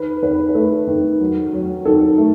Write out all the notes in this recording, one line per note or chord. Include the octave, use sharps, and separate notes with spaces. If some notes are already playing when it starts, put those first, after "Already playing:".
Already playing: D#3 B4
D#3 B4
B4
A3 A4
D#3
F#3
F#3
D#3 A4
A3